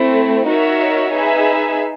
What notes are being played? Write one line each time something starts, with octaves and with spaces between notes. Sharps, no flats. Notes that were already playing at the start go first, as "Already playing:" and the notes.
Already playing: A3 C4 E4
D#4 F#4 A#4 C#5 E5
D#4 G#4 B4 E5